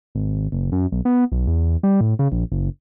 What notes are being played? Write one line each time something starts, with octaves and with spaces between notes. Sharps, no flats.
G#1
F#1
F#2
B1
B3
B1
E2
G3
A2
C#3
A#1
F#1